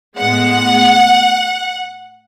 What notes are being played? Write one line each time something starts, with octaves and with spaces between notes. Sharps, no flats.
A2 G#3 B3 F#5